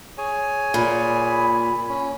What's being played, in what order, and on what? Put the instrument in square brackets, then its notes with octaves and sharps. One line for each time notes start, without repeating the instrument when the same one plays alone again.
[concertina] G#4 C#5 G#5
[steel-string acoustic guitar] A#2 [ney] B5
[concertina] C#4